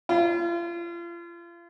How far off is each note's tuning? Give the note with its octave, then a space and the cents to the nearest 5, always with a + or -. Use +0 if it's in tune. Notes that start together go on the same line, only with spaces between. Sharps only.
F4 -35